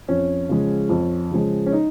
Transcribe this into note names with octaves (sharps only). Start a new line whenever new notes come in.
F2 C#4
C#3 F3 G#3
F2
C#3 F3 G#3
C#4
D#4